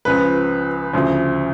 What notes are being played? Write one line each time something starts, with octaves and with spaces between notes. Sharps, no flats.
C#2 C#3 F3 B4
D2 C#3 F3